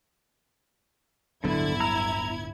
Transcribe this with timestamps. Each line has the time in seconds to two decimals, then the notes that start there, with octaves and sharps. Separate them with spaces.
1.44 D1 G1 D3 F#3 B3 E4 G#6
1.80 A#5 E6